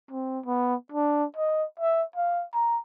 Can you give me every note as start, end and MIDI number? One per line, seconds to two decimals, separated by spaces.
0.11 0.40 60
0.46 0.75 59
0.92 1.25 62
1.37 1.65 75
1.80 2.03 76
2.16 2.44 77
2.54 2.79 82